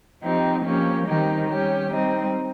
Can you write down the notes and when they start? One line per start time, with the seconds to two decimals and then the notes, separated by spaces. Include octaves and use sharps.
0.22 F3 C4 D#4 G4
0.64 F3 A#3 C#4 G4
1.06 D#3 G3 C4 D#4 G4
1.48 G3 C#4 G4
1.91 G3 C4 D#4